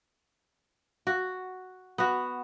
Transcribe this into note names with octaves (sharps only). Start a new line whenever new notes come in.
F#4
B3 F#4